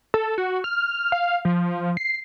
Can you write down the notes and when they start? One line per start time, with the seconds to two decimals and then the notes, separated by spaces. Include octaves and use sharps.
0.14 A4
0.38 F#4
0.64 F6
1.12 F5
1.45 F3
1.97 C7